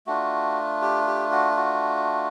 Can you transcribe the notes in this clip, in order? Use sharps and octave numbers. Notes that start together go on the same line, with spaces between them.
A3 D4 F4 F#4
G4
G4
F#4
F#4